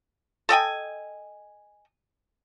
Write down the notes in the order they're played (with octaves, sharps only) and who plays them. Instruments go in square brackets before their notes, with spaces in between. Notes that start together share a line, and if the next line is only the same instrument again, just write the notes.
[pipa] A4 D#5 G5 G#5